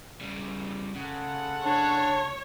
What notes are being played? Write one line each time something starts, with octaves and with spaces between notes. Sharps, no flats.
C#3 G3
C#3 G#3 A4 F#5
D4 C#5